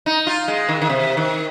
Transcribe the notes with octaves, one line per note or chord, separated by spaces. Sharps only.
D#4
F4
G#3
D#3
D#3
C3
D#3